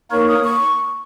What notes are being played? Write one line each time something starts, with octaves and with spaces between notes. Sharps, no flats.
A#3 D#4 A#4 C#5 C#6
D#6
C#6